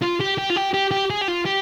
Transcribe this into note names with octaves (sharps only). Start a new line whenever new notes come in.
F4
G4
G4
F4
G4
G4
G4
G#4
G4
F4
G4